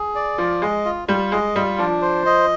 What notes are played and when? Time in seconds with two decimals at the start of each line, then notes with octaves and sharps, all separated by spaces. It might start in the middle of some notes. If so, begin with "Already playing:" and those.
Already playing: G#4
0.15 D5
0.38 F3 F4
0.62 G#3 D#5
0.85 F4
1.08 G3 F4
1.32 G#3 D#5
1.56 G3 F4
1.79 F3 D4
2.02 C5
2.26 D#5